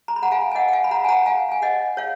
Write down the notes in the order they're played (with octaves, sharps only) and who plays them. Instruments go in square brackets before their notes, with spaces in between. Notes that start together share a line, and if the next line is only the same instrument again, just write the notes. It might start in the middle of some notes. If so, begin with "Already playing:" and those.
[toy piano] A#5
B5
F#5 A#5
F5 G#5
G#5
D#5 F#5
F#5
F5 G#5
B5
F#5 A#5
G#5
F#5 A#5
F5 G#5
G#5
D#5 F#5
C#5 F5